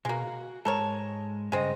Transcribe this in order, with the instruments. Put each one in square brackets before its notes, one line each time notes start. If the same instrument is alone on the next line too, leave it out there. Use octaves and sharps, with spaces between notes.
[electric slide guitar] B2 F#4 [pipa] G#3 A#3
[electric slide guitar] F#4
[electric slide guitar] G#2 G#3 A5 [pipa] A4 A#4 C#5
[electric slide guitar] G2 C#3 D#5 [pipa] G#3 C4